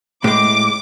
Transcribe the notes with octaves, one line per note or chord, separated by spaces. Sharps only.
A2 G#3 D6